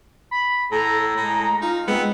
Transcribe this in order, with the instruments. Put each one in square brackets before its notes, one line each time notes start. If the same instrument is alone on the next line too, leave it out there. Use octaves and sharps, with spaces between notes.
[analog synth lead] B5
[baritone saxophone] A2 [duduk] A4 [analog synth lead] A#5
[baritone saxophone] A2 [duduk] G#3
[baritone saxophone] D#4 [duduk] F4
[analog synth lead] G#3 [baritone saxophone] B3 [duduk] C4